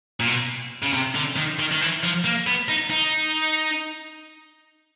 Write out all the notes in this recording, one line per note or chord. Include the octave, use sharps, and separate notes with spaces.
A#2
B2
C#3
C3
D3
D#3
D#3
D#3
E3
F3
A#3
B3
D#4
D#4